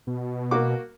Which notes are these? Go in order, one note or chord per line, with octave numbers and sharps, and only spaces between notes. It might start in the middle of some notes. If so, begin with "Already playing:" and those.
B2
A#3 F#4 D6